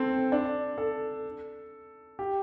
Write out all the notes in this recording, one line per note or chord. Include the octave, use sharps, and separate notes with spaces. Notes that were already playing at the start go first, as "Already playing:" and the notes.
Already playing: C4 A4
D4
A4
G4